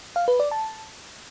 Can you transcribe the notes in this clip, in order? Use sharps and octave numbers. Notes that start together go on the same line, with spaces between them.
F5
B4
D5
A5